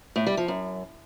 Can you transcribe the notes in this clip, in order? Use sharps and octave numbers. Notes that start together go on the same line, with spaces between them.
A2
G3
F3
F#2